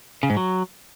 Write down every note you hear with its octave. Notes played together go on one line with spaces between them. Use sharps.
C#3
G#2
F#3